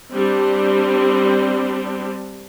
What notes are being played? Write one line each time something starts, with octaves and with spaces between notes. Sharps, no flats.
G3 C4 D4